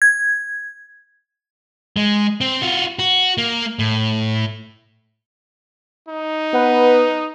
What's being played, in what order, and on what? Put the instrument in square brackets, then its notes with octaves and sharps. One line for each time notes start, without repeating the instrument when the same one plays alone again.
[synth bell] G#6
[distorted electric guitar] G#3
C4
F4 F#4
F#4
A#3
A2
[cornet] D#4
[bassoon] B3 [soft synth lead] B4